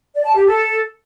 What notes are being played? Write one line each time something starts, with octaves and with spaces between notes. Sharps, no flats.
D5
A5
G4
A4